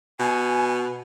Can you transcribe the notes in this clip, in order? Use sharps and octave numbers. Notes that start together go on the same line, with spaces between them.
B2 G#5